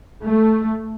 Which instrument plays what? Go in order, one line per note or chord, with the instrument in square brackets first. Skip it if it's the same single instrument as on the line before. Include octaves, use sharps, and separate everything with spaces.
[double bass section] A3